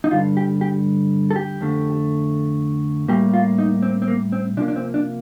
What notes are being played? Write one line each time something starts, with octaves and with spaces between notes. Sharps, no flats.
D#4
G2 D3 G3 F4
G4
G4
A4
G4
F2 D3 A3
A2 G3 A#3 G4
F4
D#4
C4
C4
A#3
C4
C3 F3 A#3 D4
D4
C4
D4